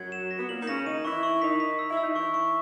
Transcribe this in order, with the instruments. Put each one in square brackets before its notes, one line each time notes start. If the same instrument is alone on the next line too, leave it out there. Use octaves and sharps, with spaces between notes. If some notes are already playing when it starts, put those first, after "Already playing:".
Already playing: [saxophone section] F#2 F#3 [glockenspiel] G#6
[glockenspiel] E7
A#6
[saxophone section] B3
[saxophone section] A#2 A#3 [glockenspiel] F#7
[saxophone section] D#4
[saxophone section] C#3 C#4 [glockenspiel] A#6
[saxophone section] D#3 D#4 [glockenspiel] D#7
[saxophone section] E3 E4 [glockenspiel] C#6
[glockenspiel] C#6
[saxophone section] D#3 D#4 [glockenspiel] B6
[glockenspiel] B6
E6
[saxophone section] E4
[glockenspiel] E6
[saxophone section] D#4
[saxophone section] E3 E4 [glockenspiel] C#6
[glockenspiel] C#6